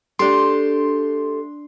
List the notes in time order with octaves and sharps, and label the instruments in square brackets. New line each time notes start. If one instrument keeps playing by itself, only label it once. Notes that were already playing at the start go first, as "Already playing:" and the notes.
[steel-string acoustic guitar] A3 G4 [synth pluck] D4 C6